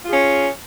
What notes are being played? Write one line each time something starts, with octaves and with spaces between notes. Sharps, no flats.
C#4 F4 G#4